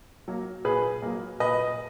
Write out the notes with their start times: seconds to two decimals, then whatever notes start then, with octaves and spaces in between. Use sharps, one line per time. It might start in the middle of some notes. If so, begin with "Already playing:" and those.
0.28 F#3 A#3
0.65 A#2 G#4 B4
1.02 F#3 A#3
1.40 A#2 B4 D#5